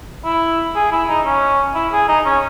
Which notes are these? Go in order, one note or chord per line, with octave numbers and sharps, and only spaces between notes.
E4
G#4
E4
D#4
C#4
E4
G#4
D#4
C#4